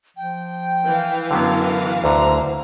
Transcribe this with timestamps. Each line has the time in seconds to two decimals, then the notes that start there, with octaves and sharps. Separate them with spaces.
0.17 F3 G5
0.85 E3 F5
1.31 F#2 D3 F#3 B3
2.04 D2 D3 C5 A#5